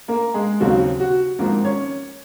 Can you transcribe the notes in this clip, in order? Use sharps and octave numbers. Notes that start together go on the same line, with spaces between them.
A#3 A#4
G#3 G#4
D#2 C#3 F#3 C4 F#4
F#4
G#1 G#2 F3 A#3 C4 A#4
C#4 C#5